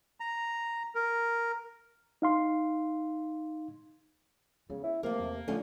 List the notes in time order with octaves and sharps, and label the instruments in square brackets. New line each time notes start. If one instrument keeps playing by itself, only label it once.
[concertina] A#5
A#4
[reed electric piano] D#4 F5 C6
[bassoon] C#3 [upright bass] B3
[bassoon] E4
[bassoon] C3 [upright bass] G3 [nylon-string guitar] A3 A#4 [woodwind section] A#3
[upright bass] E2
[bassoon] D3 [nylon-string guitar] F3 A3 C#4 [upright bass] G3